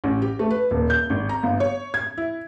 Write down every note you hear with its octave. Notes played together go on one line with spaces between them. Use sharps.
A1
G4
A3
B4
D#1
G6
G#1
A#5
G1
C#5
G#6
E4